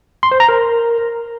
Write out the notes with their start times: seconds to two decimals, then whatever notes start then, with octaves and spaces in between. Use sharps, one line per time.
0.23 C6
0.31 C5
0.40 A#5
0.49 A#4